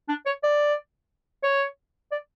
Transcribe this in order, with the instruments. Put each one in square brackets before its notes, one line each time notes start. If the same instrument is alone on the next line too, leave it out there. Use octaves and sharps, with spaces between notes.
[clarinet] D4
C#5
D5
C#5
D5